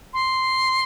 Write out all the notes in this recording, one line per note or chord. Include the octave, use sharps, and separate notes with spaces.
C6